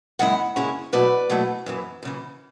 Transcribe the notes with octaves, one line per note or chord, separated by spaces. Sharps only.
F#2 C#3 G#3 E4 F#5
F#2 C#3 G#3 C#4 E4
B2 F#3 A3 E4 B4 D5
B2 F#3 A3 E4
F#2 C#3 E3
F#2 C#3 E3